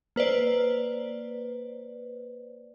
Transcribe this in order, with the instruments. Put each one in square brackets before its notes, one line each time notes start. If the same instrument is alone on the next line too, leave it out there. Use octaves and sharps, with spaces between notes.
[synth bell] A#3 B4 C5 D5